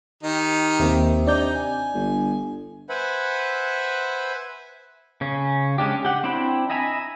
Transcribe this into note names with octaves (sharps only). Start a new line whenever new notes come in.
D#3 D#4 G4
D#2 C3 A#3
D4 D#4 D5 G6
G#5
G1
B4 C5 E5 F#5 G#5 B5
C#3 C#4
G#3 C#4 D4 G4
G4 F#5
C4 D4 E4 G5 B5
D#5 E5 G#5 A#5 B5